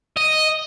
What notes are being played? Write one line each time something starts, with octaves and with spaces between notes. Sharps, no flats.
D#5